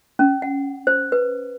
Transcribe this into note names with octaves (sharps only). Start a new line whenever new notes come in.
C#4
F#5
C5
B4